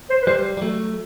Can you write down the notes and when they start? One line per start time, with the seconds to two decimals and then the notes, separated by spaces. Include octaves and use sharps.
0.10 C5
0.22 B4
0.27 G3 C5
0.57 G3
0.61 F#3 A3